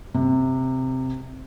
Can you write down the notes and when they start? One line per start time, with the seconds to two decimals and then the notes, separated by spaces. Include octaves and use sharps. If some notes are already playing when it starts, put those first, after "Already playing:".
0.14 C3